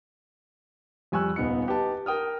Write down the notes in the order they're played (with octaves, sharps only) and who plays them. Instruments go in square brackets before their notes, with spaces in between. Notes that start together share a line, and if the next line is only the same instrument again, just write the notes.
[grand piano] F2 G3 G#5 C#6 E6 F#6
D#1 B3 D#4 C#7
D#4 G4 B4 A5
A#4 G5 D#6 F6